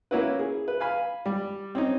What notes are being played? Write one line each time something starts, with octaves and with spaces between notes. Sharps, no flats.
A#3 C#4 E4 F#4 B4
G#4
B4
F5 G#5 B5
G3
C4 C#4 D#4